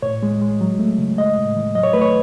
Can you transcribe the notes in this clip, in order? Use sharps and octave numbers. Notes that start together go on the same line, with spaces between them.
A2 C#5
G#3
G#3
F#3
A3
C#3
G#3 D#5
A2
E3
F#3 D#5
C#5
A3 B4
C#5